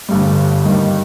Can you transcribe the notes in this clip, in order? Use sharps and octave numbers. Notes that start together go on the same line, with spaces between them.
G1 G2 G3
G2 D#3 G3